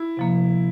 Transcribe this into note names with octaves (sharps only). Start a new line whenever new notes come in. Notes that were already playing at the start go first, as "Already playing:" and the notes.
Already playing: E4
C3 F3 A#3